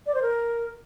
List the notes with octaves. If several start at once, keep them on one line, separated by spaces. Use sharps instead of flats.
D5
C5
A#4